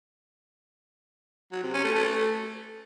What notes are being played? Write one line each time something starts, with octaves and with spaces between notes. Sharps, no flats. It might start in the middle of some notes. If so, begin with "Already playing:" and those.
F#3
C3
C#4
A3
A3